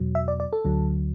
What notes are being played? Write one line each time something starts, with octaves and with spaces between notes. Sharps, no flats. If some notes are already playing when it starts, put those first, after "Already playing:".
Already playing: E2 B2 F#3
E5
D5
D5
A4
D2 D3 F#3